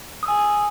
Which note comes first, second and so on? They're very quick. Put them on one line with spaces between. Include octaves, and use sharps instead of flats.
D#6 E6 G#5